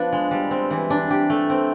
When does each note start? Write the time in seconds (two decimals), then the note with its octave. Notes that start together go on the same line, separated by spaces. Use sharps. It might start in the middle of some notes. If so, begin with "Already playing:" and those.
Already playing: F3 B3 D4
0.12 G#3
0.31 G3
0.51 C4
0.71 E3
0.90 D4
1.10 G4
1.30 A3
1.50 C4